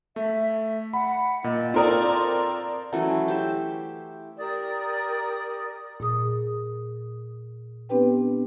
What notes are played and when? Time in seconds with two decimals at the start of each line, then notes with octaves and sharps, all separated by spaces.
0.16 A3 E5
0.93 F#5 B5
1.44 A#2 D#5
1.74 C4 F4 A4 A#4 D5 C6 D#6
2.92 E3 F#3 A3 C#4
3.28 G4 C5 E5
4.38 G4 A#4 D5 D#6
6.00 A#2 G#4 D#6
7.89 B3 C4 D4 G4 B4 G5